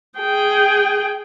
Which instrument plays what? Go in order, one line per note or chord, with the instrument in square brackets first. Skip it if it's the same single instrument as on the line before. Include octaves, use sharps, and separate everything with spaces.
[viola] G#4 G5